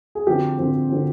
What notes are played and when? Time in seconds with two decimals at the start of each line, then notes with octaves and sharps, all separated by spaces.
0.15 G#4
0.27 D3 F3 C4 G4
0.59 D3 F3 C4
0.90 D3 F3 C4